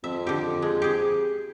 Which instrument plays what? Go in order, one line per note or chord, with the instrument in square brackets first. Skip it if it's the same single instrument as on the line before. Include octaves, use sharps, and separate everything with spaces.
[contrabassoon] F2 [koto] E5
[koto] D3 G4
G#3
G4 G#4